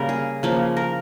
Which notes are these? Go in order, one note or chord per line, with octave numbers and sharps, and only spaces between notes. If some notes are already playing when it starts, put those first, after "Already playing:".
Already playing: C#3 G3 A#3 A#4
G#4
C#3 F3 A#3
A#4